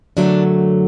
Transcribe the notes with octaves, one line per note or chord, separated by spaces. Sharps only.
F#2 D3 F#3 A3 D4